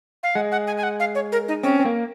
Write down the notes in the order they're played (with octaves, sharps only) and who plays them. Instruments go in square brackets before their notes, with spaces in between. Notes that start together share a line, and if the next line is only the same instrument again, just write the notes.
[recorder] F5
[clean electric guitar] G#3 [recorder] F#5
[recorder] F#5
G#5
G#5
F#5
F5
C#5
A#4
D#4
[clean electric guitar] C4 [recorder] C#4
[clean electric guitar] C4
A#3